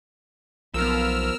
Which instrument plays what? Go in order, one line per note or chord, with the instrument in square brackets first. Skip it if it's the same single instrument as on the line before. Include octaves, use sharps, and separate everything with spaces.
[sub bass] B1 [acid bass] F3 [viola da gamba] B3 A#4 [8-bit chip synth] E6 F6